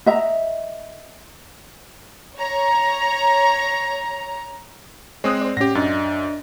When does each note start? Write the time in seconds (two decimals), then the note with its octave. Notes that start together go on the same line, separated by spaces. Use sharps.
0.06 D#5 E5 A#5
2.37 C#5 A#5
5.24 G#3 C4 C#5 D#6 F#6
5.41 C5 D5
5.57 A2 C#4 G4 F#5 A#6
5.75 F#2 D4 D5 D#5 A6